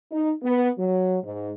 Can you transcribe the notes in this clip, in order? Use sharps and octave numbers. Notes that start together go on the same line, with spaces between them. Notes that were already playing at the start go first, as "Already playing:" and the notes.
D#4
B3
F#3
G#2